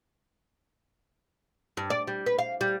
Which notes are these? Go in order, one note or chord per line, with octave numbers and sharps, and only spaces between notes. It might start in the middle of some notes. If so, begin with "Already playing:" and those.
G2
D5
G3
B4
F5
G3